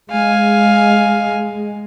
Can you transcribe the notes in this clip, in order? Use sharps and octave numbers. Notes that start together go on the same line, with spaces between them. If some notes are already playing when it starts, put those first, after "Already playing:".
G#3 F5 G#5